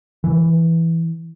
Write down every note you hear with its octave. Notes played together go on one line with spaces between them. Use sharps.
E3